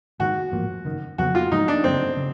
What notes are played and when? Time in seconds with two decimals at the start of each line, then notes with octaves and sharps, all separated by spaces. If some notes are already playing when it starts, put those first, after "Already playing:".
0.20 G#2 D#3 G#3 F#4
0.52 A1 G#2 F3 A#3
0.85 F#1 F#2 D#3
1.18 F2 C#3 F#3 B3 F#4
1.35 F4
1.51 G#2 F3 G#3 D#4
1.68 D4
1.84 G1 F#2 C#3 C4
2.17 C#3 F#3